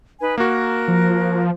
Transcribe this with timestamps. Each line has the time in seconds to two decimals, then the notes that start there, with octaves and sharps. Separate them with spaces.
0.20 D#4 B4 G#5
0.38 A#3 F#4 A#4 F#6
0.88 F3